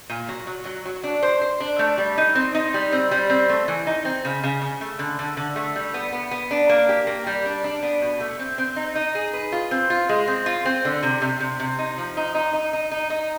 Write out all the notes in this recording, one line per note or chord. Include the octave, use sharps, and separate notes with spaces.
A#2
F#3
F#3
F#3
F#3
D4
C5
C5
D4
A3
G3
D#4
C4
D#4
G3
C4
G3
C4
A3
E3
D#4
C4
C#3
C#3
C#3
A3
D3
D3
D3
A3
G3
B3
B3
B3
D4
A#3
G4
A#3
G3
D4
D4
B3
B2
A3
C4
C4
D#4
D#4
G#4
B4
F4
C4
F4
G#3
C4
F4
C4
D3
C3
C3
C3
C3
D#4
F3
D#4
D#4
D#4
D#4
D#4
D#4